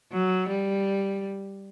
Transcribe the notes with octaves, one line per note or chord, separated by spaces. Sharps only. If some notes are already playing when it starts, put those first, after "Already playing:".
F#3
G3